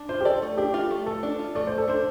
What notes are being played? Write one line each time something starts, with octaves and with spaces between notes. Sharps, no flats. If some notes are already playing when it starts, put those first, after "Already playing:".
Already playing: D4
F4 C5
G4
A4 D5
A3
D4 G4
F4
A3
A3 A4
D4
F4
A3 D5
A3 C5
A4
D4 C5